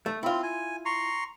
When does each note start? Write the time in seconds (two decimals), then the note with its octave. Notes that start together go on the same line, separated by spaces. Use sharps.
0.06 A3
0.23 C4 E4 F4
0.43 G#5
0.85 A#5 C6 C#6